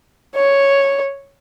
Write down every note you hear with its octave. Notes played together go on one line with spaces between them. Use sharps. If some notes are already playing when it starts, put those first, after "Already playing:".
C#5